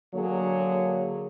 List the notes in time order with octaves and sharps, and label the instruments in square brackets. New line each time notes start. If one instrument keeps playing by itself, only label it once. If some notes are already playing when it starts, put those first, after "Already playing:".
[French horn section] D3 F#3 A#3 G#4 C#5